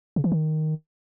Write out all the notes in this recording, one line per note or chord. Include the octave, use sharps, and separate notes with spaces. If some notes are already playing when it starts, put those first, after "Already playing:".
C#3
E3
D#3